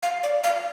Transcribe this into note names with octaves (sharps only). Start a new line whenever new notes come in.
F5
D5
F5